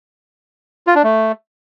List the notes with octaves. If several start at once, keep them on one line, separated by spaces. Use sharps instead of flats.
F4
D4
A3